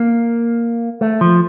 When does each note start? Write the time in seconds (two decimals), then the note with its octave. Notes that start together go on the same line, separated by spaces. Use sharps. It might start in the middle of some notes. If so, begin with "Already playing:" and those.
Already playing: A#3
1.01 A3
1.21 F3